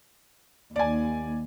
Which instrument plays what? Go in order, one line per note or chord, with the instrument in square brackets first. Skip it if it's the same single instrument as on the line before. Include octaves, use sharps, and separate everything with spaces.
[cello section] D#2 [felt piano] D5 G#5